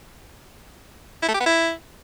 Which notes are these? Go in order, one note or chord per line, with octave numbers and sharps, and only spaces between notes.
E4
A3
G4
B3
E4